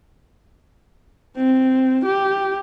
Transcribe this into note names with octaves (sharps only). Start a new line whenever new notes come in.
C4
G4